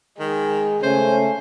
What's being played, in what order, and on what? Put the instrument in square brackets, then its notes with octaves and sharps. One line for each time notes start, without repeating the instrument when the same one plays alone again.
[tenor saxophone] D#3 [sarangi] G#3
[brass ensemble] C#3 A3 [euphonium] C#4 [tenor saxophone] C5 [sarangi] G#5